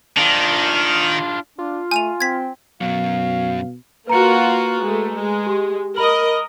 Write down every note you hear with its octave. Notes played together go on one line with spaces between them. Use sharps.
D#3 D4 F4
D4 F4
A3 G#5 D#7 F7
C4 G#6 B6
F#2 B2 F#3 F5
A#3 F4 F#4 B4 A#5 C#7
G#3 A3
G#3
G4
A#4 D#5 B5 F#7